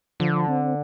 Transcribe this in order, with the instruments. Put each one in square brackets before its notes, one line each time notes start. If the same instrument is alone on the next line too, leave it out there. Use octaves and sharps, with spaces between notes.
[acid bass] D3 [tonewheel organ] F3
[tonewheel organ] C4